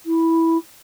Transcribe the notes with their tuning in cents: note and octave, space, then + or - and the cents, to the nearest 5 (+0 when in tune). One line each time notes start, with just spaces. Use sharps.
E4 -10